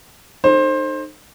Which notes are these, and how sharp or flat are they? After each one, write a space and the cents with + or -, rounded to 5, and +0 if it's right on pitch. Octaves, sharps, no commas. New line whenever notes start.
D#4 -30 A4 -10 C5 +20